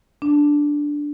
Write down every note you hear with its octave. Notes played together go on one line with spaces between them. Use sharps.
D4